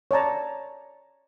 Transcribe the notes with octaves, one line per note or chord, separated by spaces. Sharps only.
C#5 D5 A5 A#5